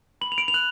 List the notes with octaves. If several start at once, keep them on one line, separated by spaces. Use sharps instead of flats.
B5 F#7
F7
D7
F7
F#6 F#7